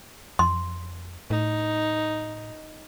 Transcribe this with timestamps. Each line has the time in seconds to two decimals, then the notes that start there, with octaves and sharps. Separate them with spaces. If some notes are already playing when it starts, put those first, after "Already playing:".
0.39 F2 C6
1.30 A2 D#4